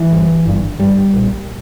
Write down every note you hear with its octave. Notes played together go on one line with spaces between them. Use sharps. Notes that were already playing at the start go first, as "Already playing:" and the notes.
Already playing: E3
G1 G2
G1 G2
G1 G2 G3
B1 A#2